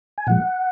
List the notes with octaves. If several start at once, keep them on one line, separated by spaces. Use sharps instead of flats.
G#5
A#2 F3 G#3 F#5